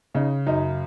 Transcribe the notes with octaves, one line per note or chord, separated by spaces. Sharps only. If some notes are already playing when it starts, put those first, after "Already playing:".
C#3 D#4
F#2 D#4